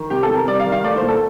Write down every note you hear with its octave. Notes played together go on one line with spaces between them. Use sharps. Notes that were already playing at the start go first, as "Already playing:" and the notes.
Already playing: D#3
C3 G4
A4
C3
A#4
G3 D5
F5
D#3
F5
A3 D5
C5
A#2
A4